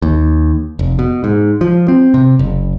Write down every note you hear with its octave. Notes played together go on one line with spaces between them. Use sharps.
D#2
F1
B2
G#2
F3
C4
C3
F#1